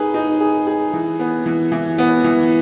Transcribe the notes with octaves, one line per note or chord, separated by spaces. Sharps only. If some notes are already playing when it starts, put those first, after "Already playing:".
Already playing: D#4 G#4 B4
D#4
G#4
G#4
E3
B3
E3
E3
B3
E3